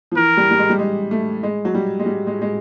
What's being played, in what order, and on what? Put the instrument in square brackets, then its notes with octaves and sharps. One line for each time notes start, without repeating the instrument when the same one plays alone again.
[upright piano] F3
[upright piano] E3 [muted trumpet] A#4
[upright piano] G3
G3
G#3
G3
G#3
A3
G#3
F#3
G3
G#3
G3
G#3
G#3